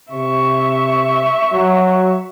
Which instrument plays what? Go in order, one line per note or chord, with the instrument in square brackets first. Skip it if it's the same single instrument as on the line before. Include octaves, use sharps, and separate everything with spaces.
[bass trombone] C3 [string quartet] E5 C#6
[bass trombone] F#3